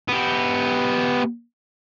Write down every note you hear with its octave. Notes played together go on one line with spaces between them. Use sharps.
B3 G4